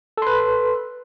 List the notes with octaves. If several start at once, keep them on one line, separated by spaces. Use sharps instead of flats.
A4 B4 C6